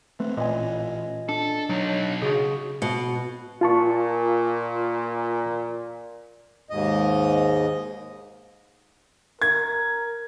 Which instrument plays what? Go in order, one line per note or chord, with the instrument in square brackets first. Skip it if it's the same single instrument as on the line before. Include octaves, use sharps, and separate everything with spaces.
[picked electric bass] A3 C4 [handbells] B4
[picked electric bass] A1 [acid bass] A#2 [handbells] D#5 G#5
[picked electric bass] D4 [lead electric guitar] A4
[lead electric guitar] B1 D#4 [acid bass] F#3
[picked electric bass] C#3 [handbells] F#4 G#4
[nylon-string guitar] B2
[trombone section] A#2 [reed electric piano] F4 A5 C#6
[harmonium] D#2 G#2 D#5
[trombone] A#4 [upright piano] G#6